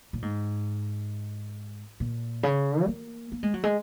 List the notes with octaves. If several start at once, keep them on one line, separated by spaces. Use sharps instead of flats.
A#2
G#2
A#2
C#3
G#3
A#3
A#3
G#3
F#3
G#3